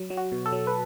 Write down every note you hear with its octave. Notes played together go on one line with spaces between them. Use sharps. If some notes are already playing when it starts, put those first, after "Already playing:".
Already playing: F#3
F#3
F#4
B2
A4
F#3
B4